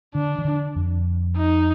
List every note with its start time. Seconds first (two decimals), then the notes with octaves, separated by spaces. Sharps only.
0.15 D3 D4
0.38 D#3
0.45 D3
0.76 F2
1.37 D#4